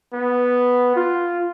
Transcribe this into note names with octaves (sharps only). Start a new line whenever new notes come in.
B3
F4